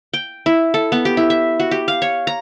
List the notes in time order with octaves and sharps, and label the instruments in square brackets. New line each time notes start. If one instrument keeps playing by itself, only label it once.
[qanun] G5
E4
A4
B3
G4
E4
E5
F#4
G4
F5
C#5
A#5